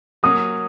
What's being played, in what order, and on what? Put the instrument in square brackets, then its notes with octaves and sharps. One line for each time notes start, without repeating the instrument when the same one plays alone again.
[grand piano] F#3 A#3 C#4 [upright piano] D#6